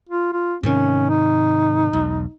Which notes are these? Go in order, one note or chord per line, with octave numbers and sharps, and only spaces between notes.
F4
F4
G#2 C3 D#3 C#4
D#4
E1 B1